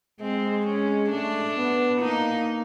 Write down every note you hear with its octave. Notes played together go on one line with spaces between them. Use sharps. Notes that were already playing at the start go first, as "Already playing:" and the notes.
G#3 C4
C#4
A3 D4
B3
A#3 D#4